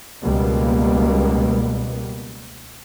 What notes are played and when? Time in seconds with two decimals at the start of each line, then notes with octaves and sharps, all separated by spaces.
0.23 C#2 B2 G3 A#3 B3